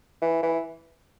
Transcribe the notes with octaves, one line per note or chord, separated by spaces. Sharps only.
E3
E3